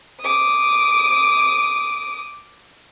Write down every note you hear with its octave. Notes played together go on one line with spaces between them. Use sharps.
D6 D#6